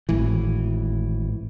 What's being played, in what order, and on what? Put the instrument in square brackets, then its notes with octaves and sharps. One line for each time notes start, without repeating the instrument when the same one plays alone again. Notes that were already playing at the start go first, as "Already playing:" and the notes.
[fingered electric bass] G#1 A2 E3